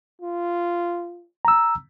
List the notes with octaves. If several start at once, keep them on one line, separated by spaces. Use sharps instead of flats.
F4
A#5 E6